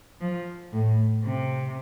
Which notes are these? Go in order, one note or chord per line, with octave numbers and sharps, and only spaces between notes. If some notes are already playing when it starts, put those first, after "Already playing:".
F3
A2
C3